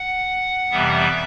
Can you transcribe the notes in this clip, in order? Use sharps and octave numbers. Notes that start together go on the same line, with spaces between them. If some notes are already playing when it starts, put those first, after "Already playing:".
Already playing: F#5
F2 C3 E3 G3 B3 E5